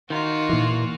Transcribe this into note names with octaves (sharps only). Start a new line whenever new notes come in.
D#3 D#4 F4 F#4
A#2 E3